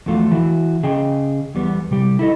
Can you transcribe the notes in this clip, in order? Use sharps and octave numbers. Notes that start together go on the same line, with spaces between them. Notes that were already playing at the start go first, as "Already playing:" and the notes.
E2 F3 A3 F4 F#4
E3 F#4
C#3 G#4 D#5 G5
E2 G3 B3
C3 G3 G4
E4 A4 D#5